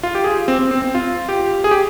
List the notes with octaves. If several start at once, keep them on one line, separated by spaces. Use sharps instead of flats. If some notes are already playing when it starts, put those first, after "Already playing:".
F4
G4
G#4
C4
C4
C4
C4
F4
G4
G#4
G4